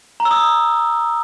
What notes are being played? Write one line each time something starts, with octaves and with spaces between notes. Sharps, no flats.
A#5
E6
D#6